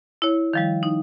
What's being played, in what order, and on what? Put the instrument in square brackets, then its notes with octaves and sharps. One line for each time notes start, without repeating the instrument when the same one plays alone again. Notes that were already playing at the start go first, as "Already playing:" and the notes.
[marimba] E4 C#5
D#3 F3 G3
D#4